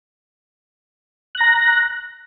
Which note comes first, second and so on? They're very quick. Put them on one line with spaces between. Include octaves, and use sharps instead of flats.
F#6 A#6 A#5